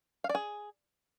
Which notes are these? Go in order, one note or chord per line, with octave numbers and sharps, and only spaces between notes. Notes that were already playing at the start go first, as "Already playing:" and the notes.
F5
D5
G#4